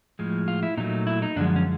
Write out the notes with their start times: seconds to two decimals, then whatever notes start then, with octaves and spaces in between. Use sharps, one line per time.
0.19 A2 F3 G#3
0.48 F4
0.63 E4
0.77 A#2 F#3 A3 D#4
1.07 E4
1.22 D#4
1.36 F#2 D3 F3 G#3 D4
1.56 C#4